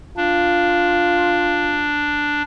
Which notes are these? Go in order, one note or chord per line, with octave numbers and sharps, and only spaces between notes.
D4 F4